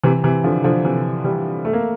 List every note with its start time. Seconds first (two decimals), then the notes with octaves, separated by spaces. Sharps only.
0.04 C3 E3
0.24 C3 E3
0.44 D3 F3
0.64 D3 F3
0.84 C3 E3
1.24 E3 G3
1.65 A3
1.73 A#3